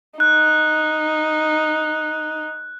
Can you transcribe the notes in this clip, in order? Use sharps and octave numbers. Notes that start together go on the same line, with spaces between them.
D#4 F#6